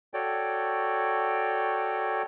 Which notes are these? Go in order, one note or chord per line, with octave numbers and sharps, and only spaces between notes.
F#4 A4 C#5 D5 G5